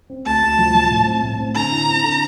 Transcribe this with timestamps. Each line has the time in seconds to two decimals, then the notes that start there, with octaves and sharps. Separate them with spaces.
0.10 C4
0.26 D2 A5
0.42 D2
0.58 F3
0.75 F3
0.90 A2
1.06 C4
1.23 A2
1.40 C4
1.55 D3 A#5
1.72 E4
1.88 C4
2.04 D3